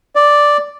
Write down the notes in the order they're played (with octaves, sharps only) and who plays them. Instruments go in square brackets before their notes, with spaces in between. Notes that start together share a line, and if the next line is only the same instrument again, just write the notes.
[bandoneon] D5